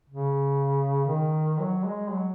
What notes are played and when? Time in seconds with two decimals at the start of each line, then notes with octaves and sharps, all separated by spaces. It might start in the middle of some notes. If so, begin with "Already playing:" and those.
0.09 C#3
1.07 D#3
1.59 F#3
1.85 G#3
2.11 F#3